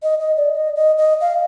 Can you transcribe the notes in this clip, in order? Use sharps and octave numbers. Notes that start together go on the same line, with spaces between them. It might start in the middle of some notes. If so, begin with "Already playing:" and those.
D#5
D#5
D5
D#5
D#5
D#5
F5